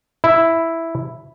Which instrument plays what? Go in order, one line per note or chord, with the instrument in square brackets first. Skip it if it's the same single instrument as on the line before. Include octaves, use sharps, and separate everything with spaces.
[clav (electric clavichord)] E4